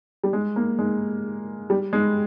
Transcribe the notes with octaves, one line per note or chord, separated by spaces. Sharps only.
G3
G#3
A#3
G#3
G3
G#3